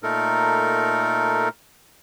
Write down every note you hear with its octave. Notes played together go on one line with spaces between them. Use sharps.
A#2 A3 D#4 A4 A#4